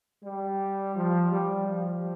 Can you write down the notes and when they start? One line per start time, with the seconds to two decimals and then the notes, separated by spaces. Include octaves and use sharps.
0.23 G3
0.96 F3
1.32 G3
1.68 F3